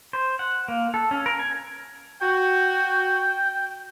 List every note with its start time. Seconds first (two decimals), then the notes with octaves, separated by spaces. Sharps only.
0.13 C5
0.39 F#5
0.68 A#3
0.94 A4
1.11 C#4
1.26 A#4
1.39 G#5
2.21 F#4 G5